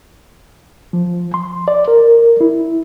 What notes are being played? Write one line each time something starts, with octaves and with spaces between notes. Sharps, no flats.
F3
C6
D5
A#4
E4